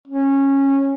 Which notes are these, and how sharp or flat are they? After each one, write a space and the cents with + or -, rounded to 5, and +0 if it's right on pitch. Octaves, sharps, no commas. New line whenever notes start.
C#4 -15